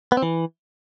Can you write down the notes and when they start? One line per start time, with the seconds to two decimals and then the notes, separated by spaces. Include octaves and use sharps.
0.12 B3
0.17 C4
0.22 E3